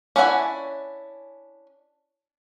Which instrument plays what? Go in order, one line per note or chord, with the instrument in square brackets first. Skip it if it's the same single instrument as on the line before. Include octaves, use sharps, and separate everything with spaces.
[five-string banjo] C#4 D4 E4 F#5 G#5